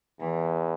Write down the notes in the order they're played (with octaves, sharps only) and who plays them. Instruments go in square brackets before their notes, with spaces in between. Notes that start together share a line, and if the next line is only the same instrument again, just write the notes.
[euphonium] E2 [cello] E3